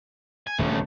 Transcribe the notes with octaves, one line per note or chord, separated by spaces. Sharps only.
G#5
D#1 D2 C#3 A3 C#4